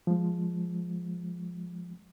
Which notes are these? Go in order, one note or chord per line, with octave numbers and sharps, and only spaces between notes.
F3 G#3